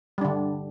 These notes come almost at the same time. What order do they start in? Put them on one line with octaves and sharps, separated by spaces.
G3 D4 D3